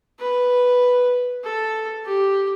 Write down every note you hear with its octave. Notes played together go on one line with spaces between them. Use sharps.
B4
A4
G4